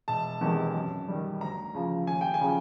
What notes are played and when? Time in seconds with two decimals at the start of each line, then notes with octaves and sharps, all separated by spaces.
0.08 E1 A5
0.41 E2 C3 D#3 G#3
0.74 F#2
1.08 D#3 G3
1.41 D2 A#5
1.75 C#3 F3
2.07 D#2 G#5
2.21 G5
2.34 G#5
2.41 C#3 F3